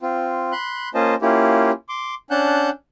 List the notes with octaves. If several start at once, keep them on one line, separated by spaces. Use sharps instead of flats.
C4 F4
B5 C6 F#6
A#3 C#4 F4 C5 D#5 A5
A#3 C#4 E4 F4 G4
C6 D6
C#4 D4 F#5 A5 F#6 G6